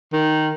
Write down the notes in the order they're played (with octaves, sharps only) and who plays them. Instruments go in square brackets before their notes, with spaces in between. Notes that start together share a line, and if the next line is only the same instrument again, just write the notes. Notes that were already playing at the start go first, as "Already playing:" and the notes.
[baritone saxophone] D#3